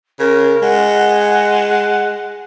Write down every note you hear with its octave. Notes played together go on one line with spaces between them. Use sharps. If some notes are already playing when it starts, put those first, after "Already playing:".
C#3 A#4
G#3 F#5